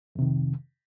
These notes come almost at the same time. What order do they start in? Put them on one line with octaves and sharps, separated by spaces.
F2 C3 D#3